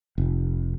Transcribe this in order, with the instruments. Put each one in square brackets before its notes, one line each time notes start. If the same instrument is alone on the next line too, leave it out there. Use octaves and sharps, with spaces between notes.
[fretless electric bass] F1